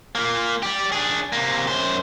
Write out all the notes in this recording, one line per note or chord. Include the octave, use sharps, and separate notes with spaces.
A#3 F4
G4 D5
D4 G#4
C3 A#3
F#2 C5